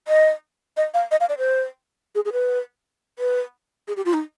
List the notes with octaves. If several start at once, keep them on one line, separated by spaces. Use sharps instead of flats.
D#5
D#5
F5
D#5
F5
D5
C5
G#4
G#4
B4
B4
G#4
G4
F4
D#4